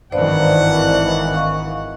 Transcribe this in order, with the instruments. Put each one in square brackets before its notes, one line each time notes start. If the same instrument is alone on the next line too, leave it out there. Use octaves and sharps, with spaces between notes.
[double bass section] G#1 D#3 E3 [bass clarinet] G2 [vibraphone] C5 D5 F5 [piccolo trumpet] F#5
[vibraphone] D#5 F5 C#6